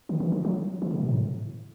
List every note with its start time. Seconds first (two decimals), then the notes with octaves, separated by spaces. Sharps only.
0.09 D#3
0.20 E3
0.32 D#3
0.45 F#3
0.82 E3
0.91 C#3
1.00 B2
1.09 A2